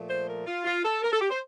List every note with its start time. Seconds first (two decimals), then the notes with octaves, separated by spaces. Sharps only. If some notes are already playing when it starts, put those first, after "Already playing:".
Already playing: A#2 F3 A3
0.09 C5
0.28 A#4
0.47 F4
0.65 F4
0.84 A4
1.03 A#4
1.11 A4
1.21 G4
1.30 C5